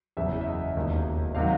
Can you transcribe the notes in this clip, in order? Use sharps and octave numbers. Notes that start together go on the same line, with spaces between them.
F#1 E2 C#3 E5
E5
D#5
E1 D#2 D#3
C3 D#3 F#3 F5